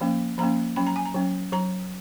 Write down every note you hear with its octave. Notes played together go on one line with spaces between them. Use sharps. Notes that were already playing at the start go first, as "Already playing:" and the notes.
F3 A#3 C#4
F3 A#3 C#4 A#5
F#3 C#4 B5
A#5
G#5
A#5
F#3 C#4
F#3 A#5